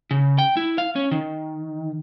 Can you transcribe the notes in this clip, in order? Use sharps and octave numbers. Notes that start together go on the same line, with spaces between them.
C#3
G5
E4
F5
C#4
D#3